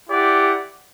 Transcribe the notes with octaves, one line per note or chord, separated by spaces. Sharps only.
E4 G4 D5 F#5